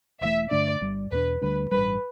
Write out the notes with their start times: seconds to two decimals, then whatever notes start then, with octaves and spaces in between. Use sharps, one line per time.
0.21 E1 E2 E3 A3 E5
0.51 G2 D3 A3 D4 D5
0.81 G1 G2 G3
1.11 E2 B2 A3 D4 B4
1.41 D2 D3 G3 D4 B4
1.71 A1 G2 G3 B4